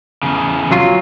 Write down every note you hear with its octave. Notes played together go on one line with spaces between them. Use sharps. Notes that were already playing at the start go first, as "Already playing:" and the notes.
E2 C#3
F#3 F4